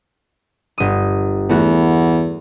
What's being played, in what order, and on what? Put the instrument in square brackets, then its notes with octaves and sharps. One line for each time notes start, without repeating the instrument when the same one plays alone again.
[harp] G1 D#6
[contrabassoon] E2 [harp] A3 F#4